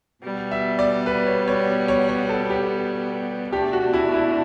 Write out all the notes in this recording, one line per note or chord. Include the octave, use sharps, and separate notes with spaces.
B2 G3 B3
E5
D5
B4
C#5
C#5
C#5
C#5
A4
G4
B2 A3 D4 G4
F#4
E4
E4